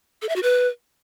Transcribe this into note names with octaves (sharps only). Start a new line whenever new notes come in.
A4
E5
F#4
B4